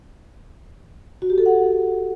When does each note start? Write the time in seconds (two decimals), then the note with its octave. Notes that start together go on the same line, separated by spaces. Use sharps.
1.22 F#4
1.30 G4
1.38 A4
1.46 F#5